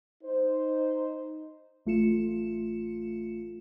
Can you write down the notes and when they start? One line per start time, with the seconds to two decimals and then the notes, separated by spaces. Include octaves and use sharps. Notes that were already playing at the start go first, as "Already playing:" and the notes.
0.24 D#4 C5
1.86 A1 A3 F4 C#7 E7